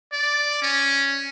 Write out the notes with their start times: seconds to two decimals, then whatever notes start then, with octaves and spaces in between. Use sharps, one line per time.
0.12 D5
0.62 C#4